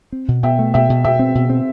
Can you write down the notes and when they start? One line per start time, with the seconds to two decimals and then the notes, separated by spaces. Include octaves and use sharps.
0.12 C4
0.28 B2
0.43 B2 E5 G5
0.59 A3
0.74 B2 E5 G5
0.90 B2
1.05 B2 E5 G5
1.19 C4
1.35 B2
1.50 C4